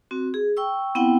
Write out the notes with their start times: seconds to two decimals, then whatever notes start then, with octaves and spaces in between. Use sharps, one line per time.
0.11 C4 F#4
0.34 G#4
0.57 G5 C#6 E6
0.95 B3 C4 E4 F#5 G5